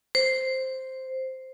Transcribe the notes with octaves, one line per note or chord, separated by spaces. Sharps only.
C5